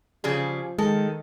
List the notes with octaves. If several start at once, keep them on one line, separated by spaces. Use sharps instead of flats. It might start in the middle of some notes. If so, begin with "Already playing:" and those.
C#3 F3 G3 G#4
D#3 G#3 A4